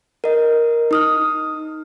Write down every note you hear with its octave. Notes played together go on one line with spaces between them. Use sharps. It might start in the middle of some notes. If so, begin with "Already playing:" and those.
A#4 D#5
D#4 D#6 F6